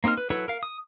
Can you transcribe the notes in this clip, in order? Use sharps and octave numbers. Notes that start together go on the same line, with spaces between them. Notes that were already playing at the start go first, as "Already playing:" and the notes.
A#3 C4 D#4 A#4 F6
B4
F#3 E4 A4 B4 C#5
A#4 F5
D#6